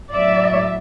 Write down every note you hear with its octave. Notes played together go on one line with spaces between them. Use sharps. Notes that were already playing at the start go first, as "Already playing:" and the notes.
A2 F#3 D5 E5